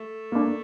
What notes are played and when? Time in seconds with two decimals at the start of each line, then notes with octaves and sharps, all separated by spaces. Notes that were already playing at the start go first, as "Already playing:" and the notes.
Already playing: A3
0.32 A#3 D4